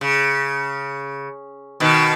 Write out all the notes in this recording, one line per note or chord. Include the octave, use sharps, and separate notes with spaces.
C#3
B2 D#3